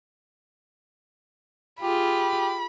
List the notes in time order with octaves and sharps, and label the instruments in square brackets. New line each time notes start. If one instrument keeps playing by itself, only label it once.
[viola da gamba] F4 G#4 [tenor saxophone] G4 [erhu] B5